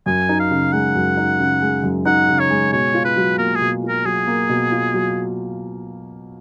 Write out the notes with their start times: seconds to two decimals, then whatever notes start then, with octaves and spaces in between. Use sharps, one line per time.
0.06 F#2 G#5
0.29 D#4
0.40 F5
0.51 C#3
0.73 G#3 F#5
0.95 F#2
1.17 D#4
1.39 C#3
1.62 G#3
1.84 F#2
2.05 D#4 F#5
2.28 C#3
2.40 C#5
2.50 G#3
2.72 B2 C#5
2.94 F4
3.05 B4
3.17 F#3
3.38 A#3 A#4
3.55 G#4
3.61 B2
3.83 F4
3.88 A#4
4.05 F#3 G#4
4.27 A#3
4.49 B2
4.72 F4
4.94 F#3